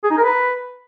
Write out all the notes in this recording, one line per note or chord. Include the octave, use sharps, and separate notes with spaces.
G#4
D#4
A#4
B4